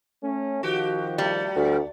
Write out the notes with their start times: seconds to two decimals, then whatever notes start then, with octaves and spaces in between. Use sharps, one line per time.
0.23 A3 C#4
0.63 D#3 F3 F#4 G4
1.18 G3 A3
1.56 D2